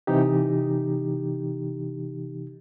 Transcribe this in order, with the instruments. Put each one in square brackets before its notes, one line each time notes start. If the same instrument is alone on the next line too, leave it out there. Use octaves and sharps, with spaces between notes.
[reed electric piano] C3 E3 D#4 G4